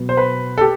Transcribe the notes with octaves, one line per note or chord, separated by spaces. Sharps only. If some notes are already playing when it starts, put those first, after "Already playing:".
Already playing: B2 F#3 B3
C5
B4
A4
G4